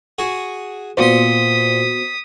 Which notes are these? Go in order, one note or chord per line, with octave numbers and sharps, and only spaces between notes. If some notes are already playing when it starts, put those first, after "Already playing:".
F#4 G#4
A#2 B3 F#4 C5 C6 D#6 B6